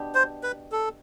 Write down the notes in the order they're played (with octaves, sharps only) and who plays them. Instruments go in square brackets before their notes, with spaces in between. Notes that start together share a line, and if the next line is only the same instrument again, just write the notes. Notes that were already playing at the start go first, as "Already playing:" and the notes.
Already playing: [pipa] B2 D4 G4
[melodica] C5
B4
A4